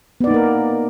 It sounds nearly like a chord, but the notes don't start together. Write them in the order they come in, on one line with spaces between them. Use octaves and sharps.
B3 D5 D#4 A#3 A#4